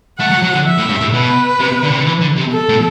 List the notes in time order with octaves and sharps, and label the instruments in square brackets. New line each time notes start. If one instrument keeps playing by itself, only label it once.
[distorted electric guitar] A3 [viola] F#5
[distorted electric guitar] F#3
F#3
D3
[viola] E5
[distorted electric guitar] A2
G2
A2
[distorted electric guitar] B2 [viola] B4
[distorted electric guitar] C3
D3
C3
D3
E3
D3
C3
[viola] A4
[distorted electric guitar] A2